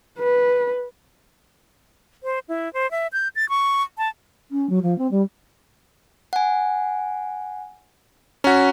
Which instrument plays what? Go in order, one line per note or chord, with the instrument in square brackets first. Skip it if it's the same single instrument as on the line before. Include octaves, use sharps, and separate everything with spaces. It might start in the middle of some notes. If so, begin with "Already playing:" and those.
[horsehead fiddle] B4
[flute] C5
E4
C5
E5
G6
A6
C#6
A5
[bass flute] C#4
F#3
F3
C4
G3
[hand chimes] F#5 G#5
[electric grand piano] C#4 F#4 [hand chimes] A#5 B6